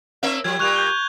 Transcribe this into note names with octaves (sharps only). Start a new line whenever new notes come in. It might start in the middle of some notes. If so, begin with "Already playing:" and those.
A#3 C4 E5
F3 G3 G#6
A#2 G3 C#6 F#6 F7
G6 G7